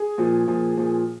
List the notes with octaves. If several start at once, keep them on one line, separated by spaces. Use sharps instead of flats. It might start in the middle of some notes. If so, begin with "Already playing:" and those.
Already playing: G#4
A#2 F3
A#2 F3
A#2 F3